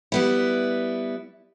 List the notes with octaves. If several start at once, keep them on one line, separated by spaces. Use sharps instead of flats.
G3 B3 E4